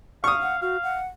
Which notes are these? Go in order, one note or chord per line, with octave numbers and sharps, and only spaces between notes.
F5 C#6 D#6
F#5
F#4 F5
F#5